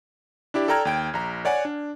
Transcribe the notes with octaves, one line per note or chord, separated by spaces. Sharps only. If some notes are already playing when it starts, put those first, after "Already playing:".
D4 E4 G4 D5
A4 D5 G5 A#5 F6 G#6
D#2 G5 D7
A#1 A#5
C#5 D5 F#5 G#5
D4